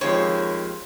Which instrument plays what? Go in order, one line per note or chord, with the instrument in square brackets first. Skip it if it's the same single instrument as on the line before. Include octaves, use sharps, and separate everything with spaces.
[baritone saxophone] D#2 [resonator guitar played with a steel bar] F3 G#3 C4 [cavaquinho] C#5